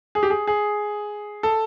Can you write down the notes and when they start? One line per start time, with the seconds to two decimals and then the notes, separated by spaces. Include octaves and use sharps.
0.15 G#4
0.23 G4
0.30 G#4
0.47 G#4
1.43 A4